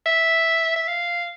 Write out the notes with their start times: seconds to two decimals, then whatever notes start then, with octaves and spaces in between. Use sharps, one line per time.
0.06 E5
0.76 E5
0.88 F5